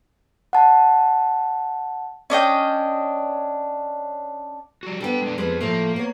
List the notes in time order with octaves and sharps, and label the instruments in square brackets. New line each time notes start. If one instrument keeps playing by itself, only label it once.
[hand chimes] F#5 A5
[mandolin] C#4 D4 D#5 G5
[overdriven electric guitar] G3 F#4
[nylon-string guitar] D3 B3 [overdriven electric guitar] G3 G5
[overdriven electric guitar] G#3 D4
[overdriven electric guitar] F2 F3 [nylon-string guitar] G#3 B4
[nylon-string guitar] A2 F3 A3 [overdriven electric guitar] A#3
[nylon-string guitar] B3 C#5